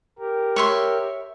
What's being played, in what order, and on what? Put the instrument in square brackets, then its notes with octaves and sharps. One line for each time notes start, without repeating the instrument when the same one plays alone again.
[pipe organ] G4 A#4
[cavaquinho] C#5 E5 C6